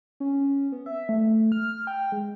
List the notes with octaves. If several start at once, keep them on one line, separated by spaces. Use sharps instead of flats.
C#4
B3
E5
A3
F6
G5
G#3